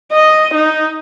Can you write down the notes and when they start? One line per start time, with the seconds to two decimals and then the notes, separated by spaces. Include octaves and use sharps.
0.12 D#5
0.54 D#4